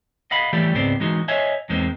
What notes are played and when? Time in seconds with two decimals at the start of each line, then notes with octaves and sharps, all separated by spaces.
0.31 D#5 F5 F#5 B5
0.53 E3 G3 A3 G4 A4 D5
0.75 C#2 G#2 B3 C4 C5 D5
1.00 E3 G#3 D#4 F#4
1.28 C5 C#5 D#5 E5 G#5
1.69 E2 D#3 G#3 A#3 C4